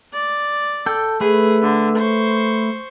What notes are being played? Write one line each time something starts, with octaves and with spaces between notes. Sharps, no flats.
D5
A4 G5
A3 G#4 B4
D3
C5 C#6